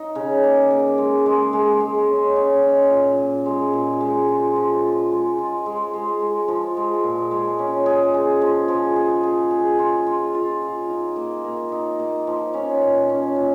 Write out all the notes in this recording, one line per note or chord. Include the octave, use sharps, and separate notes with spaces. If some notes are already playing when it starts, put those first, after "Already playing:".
Already playing: D#4
C#3
A#3
A#3
G#3
G#3
G#3
G#3
C#4
C#4
C#4
A#2
A#2
G#3
A#2
G#3
F4
F3
F4
G#3
F4
G#3
G#3
G#3
F3
G#3
A#2
G#3
C#4
G#4
G#4
F3
F3
G#4
G#4
G#4
F4
F4
F4
F4
D#4
A#3
A#3
D#4
A#3
F3
C#4
A#2
C#4
A#2